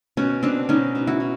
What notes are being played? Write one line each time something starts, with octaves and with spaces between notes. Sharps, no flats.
B2 C#4
B2 C4 D4
B2 C#4 D#4
B2
E4 F#4
B2